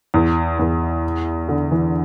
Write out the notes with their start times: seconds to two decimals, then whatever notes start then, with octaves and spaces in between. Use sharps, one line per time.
0.14 E2
0.59 E2
1.49 D3
1.71 E3